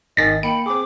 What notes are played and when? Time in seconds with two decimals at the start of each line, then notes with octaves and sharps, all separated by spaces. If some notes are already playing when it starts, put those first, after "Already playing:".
0.17 G#1 D#3 D#5 G#5 A6 A#6
0.43 A#3 G5 B5 C#7
0.66 C4 G#4 D6